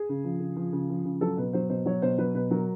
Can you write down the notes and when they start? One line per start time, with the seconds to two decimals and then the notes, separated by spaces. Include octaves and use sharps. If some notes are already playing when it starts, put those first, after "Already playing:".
Already playing: G#4
0.09 C#3
0.24 F3
0.40 C#3
0.56 F3
0.73 C#3
0.90 F3
1.05 C#3
1.21 F#3 A4
1.37 B2 B4
1.53 F#3 C5
1.69 B2 C5
1.86 F#3 C#5
2.02 B2 C5
2.18 F#3 B4
2.34 B2 B4
2.51 F#3 A#4